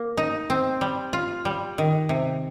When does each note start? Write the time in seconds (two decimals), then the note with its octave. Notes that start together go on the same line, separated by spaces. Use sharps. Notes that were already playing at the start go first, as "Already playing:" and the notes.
Already playing: A#3
0.17 D#4
0.50 C4
0.81 G3
1.13 F4
1.45 G3
1.78 D#3
2.09 C3